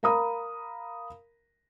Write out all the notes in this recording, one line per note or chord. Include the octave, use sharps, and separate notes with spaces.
A#4 F5 A#5 B5 D#6